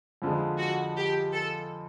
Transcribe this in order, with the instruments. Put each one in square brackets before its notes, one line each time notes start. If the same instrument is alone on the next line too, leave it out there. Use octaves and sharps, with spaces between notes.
[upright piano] F2 D3 F3 G#3
[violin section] F#4
G4
A4